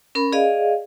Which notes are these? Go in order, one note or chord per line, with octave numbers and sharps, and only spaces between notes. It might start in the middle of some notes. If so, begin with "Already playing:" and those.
C#4 A#4 B5
G#4 D5 D#5 F5